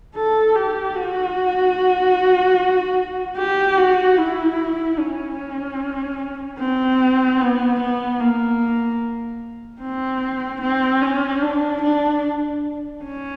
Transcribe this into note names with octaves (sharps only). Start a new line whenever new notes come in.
A4
G4
F#4
G4
F#4
E4
C#4
C4
B3
B3
A#3
C4
C4
C#4
D4
D4
C#4